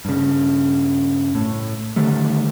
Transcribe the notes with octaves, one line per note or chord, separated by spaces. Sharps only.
G2 C#3
A2
D3 D#3 G3 A3